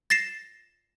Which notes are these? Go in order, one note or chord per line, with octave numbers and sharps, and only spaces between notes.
A6 A#6 C7 E7